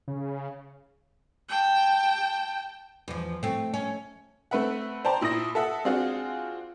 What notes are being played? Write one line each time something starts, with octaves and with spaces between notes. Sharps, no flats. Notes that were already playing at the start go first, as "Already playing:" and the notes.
C#3
G5 A5
E2 F3
A3 C4
C#4
A3 C4 B4 E5 F#5
C5 D5 G5 A5 A#5
A#2 E4 D#6 A#6
A4 E5 F#5
G#3 C4 D4 F4 F#4 G#4